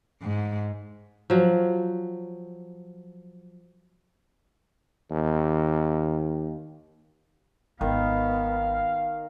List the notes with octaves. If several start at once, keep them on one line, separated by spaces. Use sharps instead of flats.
G#2
F3 F#3
D#2
G#1 D#3 B3 F5